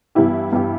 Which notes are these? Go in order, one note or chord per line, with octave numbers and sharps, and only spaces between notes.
G2 E3 B3 E4 G4
G2 E3 B3 E4 G4